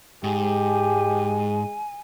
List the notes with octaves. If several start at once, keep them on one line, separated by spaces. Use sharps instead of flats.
G#2 G#3 G4 G#5